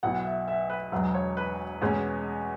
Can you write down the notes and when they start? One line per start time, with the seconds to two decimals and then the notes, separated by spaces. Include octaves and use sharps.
0.03 B1 B2 B3 E4 F#5
0.24 E5
0.48 E5
0.70 B4
0.92 E1 E2 B2 F#3
1.14 C#5
1.37 B4
1.81 E2 B2 G#3 C#4